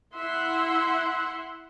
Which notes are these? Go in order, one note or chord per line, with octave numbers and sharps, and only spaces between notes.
E4 E5 F#5 C6